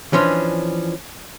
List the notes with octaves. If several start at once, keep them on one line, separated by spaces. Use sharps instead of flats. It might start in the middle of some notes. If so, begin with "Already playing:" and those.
E3 F3 C#4 D4